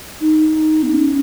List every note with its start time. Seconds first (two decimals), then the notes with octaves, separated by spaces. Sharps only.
0.21 D#4
0.83 B3
0.91 C#4